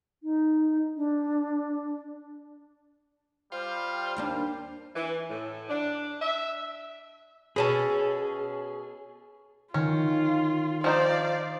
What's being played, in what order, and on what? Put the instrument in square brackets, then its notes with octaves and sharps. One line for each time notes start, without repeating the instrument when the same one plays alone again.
[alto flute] D#4
D4
[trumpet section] G3 [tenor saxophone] F4 [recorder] C5
[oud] D#2 A#3 D4
[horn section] E3
A2
D4
E5
[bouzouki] B2 C#4 A4 [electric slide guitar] G#4
[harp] D#3 [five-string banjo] C#4 [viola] F4
[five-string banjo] F3 D#4 C5 [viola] D5 F5